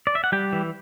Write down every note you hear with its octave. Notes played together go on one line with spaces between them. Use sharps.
D5
E5
F#5
G3 G4 G5
E3